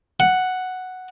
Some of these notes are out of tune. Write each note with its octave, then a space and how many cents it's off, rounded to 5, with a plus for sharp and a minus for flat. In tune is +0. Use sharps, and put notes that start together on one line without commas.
F#5 +0